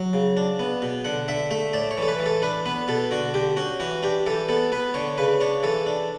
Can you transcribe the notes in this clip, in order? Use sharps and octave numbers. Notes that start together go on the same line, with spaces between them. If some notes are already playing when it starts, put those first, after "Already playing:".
Already playing: F#3
C#3
D4
B3
B2
D3 F#5
D3 E5
A3 E5
A2 D5
C#5
E3
A4
B4
E3
A4
D4 B4
B3 B4
B2 A4
D3 F#4
D3 G4
C#4 F#4
E3 F#4
D4 G4
E3 A4
B3 A4
B3 B4
D3 C#5
C#3 B4
D4 C#5
E3 A4
D4